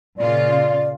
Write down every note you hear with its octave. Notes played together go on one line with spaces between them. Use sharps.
A#2 C#3 F4 D5